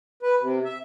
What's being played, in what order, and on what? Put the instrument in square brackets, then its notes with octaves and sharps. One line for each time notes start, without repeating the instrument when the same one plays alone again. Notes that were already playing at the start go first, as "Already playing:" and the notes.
[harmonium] B4
C3
E5